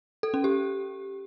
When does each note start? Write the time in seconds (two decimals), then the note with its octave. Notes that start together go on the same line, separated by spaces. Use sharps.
0.23 A4
0.34 C#4
0.44 G4